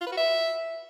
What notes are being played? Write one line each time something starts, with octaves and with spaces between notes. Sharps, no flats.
F4
B4
F#4
E5